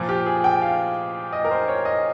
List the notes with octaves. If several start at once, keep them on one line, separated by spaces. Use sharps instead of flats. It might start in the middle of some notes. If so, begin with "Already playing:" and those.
Already playing: A#2 F3
G4
G#4
G5
F5
D#5
A#4
C5
C#5
D#5